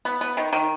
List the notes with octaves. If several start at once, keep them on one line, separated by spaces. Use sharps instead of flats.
B3
B3
D#3
D#3